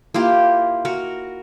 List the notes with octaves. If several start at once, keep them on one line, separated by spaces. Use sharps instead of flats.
A#3 E4 F4 G4
F#4 A#4